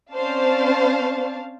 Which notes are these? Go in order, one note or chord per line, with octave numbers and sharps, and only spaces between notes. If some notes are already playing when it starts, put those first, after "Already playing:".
C4 C#4 C5 D5 F5 A5